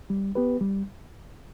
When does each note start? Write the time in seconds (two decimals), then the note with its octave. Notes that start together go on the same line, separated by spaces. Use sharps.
0.10 G3
0.35 B3 G4 B4
0.61 G3